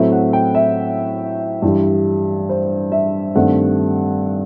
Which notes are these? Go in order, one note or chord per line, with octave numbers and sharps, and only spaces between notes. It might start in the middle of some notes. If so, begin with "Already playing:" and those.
Already playing: A2 F#3 A3 C4 E5
F#5
G5
E5
G2 E3 G3
C5
E5
G2 D#3 A3 C4 F#5